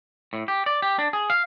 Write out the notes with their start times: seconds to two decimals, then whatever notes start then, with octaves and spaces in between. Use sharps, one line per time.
0.33 A2
0.48 G4
0.66 D5
0.82 G4
0.99 D4
1.13 G#4
1.30 F5